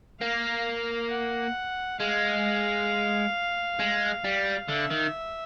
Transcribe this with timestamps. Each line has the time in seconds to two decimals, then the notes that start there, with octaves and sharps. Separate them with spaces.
0.21 A#3 F5
1.11 F#5
2.00 G#3 F5
3.80 G#3
4.24 G3
4.69 D3 E5
4.91 D#3